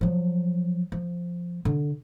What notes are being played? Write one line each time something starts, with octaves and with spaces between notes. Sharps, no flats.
F3 F#3
F3
D3